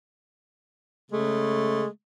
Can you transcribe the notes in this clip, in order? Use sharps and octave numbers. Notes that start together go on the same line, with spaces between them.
C#3 G#3 A3